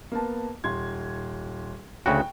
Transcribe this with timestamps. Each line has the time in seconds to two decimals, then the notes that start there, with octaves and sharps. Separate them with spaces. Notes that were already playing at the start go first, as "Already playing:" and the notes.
0.12 A#3 B3 A5
0.64 D#1 C6 G#6
2.06 D2 C#3 F#4 G5